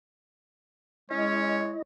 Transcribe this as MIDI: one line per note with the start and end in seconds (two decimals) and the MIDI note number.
1.11 1.74 56
1.11 1.58 61
1.11 1.82 64
1.11 1.80 73
1.11 1.82 75